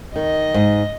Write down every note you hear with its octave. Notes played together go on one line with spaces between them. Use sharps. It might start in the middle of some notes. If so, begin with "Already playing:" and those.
D#3 D#5
G#2